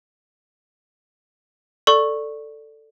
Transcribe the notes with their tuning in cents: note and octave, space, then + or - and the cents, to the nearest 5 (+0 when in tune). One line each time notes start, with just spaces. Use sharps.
A4 +10 D5 +0 C#6 -10